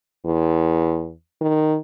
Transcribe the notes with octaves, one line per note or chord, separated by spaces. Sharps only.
E2
D#3